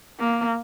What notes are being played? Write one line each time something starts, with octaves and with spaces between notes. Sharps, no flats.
A#3